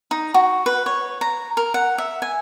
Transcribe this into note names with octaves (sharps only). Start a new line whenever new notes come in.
D#4
F#4
B4
C#5
A#5
A#4
F#5
E5
G#5